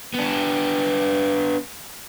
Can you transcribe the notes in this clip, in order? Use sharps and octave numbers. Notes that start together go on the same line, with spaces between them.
B3 D4